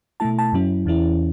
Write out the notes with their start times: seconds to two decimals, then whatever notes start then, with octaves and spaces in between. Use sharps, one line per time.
0.20 B2 A3 E4 A5
0.39 A5
0.53 F#2 F#3 C#4 E4
0.86 E2 E3 C#4 E4